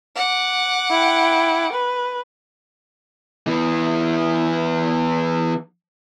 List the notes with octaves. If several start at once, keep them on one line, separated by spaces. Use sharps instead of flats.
F#5 D6
E4 G5
B4
E3 B3